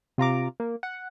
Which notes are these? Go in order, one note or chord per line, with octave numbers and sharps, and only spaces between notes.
C3 F4 A#5 D6
A#3
F#5